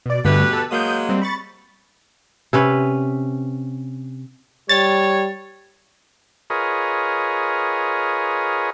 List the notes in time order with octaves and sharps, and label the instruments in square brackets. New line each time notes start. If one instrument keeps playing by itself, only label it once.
[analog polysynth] B2 D5
[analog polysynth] G2 D3 A3 [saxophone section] B2 G4 B4
[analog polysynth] A4 A5
[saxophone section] F#3 G#3 A#3 [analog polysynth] D#6 G6
[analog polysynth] G3 C4
B5 C#6 A6
[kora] C3 C#4 B4
[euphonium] G3 [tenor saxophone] C#5 [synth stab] A6
[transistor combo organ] F4 G#4 A#4 B4 C#5 D#5